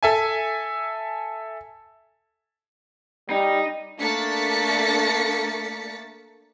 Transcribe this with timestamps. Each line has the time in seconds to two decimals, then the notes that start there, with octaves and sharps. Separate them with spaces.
0.03 A4 E5 G#5
3.30 G3 D#4
3.99 A3 A#3 D4 A6 B6 C#7